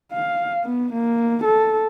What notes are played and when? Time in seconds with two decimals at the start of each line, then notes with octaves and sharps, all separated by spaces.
0.13 F5
0.64 B3
0.94 A#3
1.45 A4